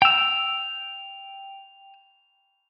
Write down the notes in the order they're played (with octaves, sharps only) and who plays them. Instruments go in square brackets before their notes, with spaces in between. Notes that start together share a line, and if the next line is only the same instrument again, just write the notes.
[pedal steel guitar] G5 E6 [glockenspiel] F7